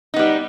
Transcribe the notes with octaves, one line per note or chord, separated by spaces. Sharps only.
G3 B3 D#4